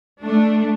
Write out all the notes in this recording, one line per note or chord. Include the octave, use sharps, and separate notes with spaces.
A3 D4